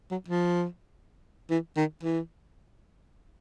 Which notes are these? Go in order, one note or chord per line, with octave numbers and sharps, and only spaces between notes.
F#3
F3
E3
D#3
E3